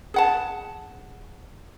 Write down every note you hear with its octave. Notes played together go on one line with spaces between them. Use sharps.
G#4 F#5 A5